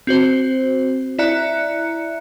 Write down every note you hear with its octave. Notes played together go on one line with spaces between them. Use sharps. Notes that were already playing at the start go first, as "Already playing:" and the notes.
C4 F#4 C5
E4 D5 E5 A#5 F#6 C#7